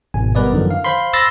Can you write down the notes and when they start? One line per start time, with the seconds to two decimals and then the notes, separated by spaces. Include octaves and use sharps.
0.14 G#1 B2 G#5
0.35 G3 B3 A#4 B4 D5 D#5
0.52 F#2 D3 D#3 F3
0.71 F5
0.84 C5 F5 B5 C6
1.13 B5 C6 E6 A6 A#6